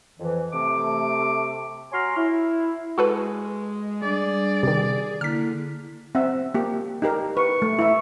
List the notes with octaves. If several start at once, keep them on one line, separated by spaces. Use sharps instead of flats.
F2 E3
C3 A3 D6
F#4 C#5 G#5 A#5 C6 F6
E4
G#3 F#4 A4 B4
G3 D4 G#4 D5
C3 D#3
D3 A#3 E4 F6 B6
C4 E5 F#5
A#3 G4
D#4 G4 A#4
B4 C#6
A3
E4 E5